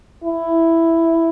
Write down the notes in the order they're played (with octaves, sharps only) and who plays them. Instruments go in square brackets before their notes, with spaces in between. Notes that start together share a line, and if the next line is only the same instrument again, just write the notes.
[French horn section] E4